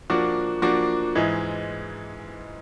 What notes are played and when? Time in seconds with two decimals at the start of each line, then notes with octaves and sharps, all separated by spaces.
0.10 F3 A#3 D4 F#4
0.62 F3 A#3 D4 F#4
1.15 G#2 E3 G#3